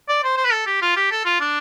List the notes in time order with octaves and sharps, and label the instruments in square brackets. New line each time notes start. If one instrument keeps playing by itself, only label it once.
[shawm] D5
C5
C5
B4
A4
G4
F4
G4
A4
F4
D4